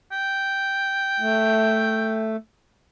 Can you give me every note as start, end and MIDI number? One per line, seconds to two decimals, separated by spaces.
0.12 2.27 79
1.20 2.36 57